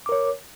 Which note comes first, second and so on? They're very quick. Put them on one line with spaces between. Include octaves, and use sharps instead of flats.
D6 A#4 C#5